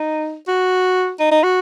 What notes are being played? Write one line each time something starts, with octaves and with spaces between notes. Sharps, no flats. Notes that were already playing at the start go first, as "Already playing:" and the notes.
Already playing: D#4
F#4
D#4
D#4
F#4